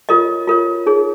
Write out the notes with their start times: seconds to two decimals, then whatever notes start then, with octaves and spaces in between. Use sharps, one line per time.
0.09 F4 A#4 C#5 D#5
0.47 F4 A#4 C#5
0.86 D#4 G#4 C#5